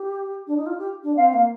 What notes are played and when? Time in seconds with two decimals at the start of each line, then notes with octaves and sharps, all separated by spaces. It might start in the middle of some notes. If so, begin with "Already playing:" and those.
Already playing: G4
0.47 D4
0.57 D#4
0.66 F4
0.78 G4
1.03 D4
1.16 C4 F5
1.33 A#3 F5